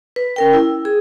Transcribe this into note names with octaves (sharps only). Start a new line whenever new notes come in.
B4
C#4 A#4 G5
E4
G#4